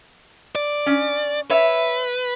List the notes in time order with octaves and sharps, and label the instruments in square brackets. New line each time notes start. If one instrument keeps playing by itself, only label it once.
[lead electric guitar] D5
[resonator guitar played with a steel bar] C#4
[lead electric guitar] B4 [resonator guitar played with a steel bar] C#5 E5